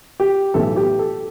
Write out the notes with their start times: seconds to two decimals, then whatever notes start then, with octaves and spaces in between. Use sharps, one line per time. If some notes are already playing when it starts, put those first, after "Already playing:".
0.20 G4
0.54 B1 A2 E3 A4
0.76 G4
0.99 A4